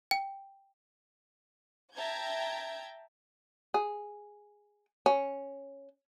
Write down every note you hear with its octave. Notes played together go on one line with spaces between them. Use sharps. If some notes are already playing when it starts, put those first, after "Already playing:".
G5
E5 G5 A5 A#5 G6 G#6
G#4
C#4